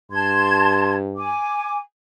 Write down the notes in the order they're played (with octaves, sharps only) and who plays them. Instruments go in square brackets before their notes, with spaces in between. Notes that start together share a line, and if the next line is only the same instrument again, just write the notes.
[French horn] G2 [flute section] A5 C6 G#6
[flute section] G#5 D6